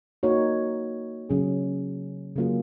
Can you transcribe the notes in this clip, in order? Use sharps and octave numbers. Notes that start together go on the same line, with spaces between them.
A#3 D#4 F#4 C#5
C#3 F#3 C#4 G#4
C#3 F#3 A#3 F4 G#4